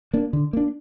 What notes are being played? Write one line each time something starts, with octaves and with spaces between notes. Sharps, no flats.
A#3 D4
D3
A#3 D4